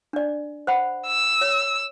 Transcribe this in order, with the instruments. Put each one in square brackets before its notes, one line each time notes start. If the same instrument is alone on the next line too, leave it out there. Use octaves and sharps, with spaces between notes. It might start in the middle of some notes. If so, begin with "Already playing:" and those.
[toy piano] D4 D5
C5 F#5 B5
[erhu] E6
[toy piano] C#5